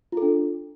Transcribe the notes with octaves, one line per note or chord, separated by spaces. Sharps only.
D4 F4 A4